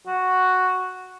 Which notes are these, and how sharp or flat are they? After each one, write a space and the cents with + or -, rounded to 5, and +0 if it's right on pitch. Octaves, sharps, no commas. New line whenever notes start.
F#4 +0